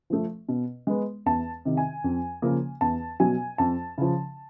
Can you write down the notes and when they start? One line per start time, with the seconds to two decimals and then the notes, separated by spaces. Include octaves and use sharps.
0.10 F3 A3
0.48 B2
0.87 G#3 B3
1.26 E2 A5
1.65 C3 D#3
1.77 G#5
2.04 F2
2.42 C#3 F3 A#3
2.81 E2 A5
3.20 B2 F#3 G#5
3.58 F2 A5
3.98 C#3 F3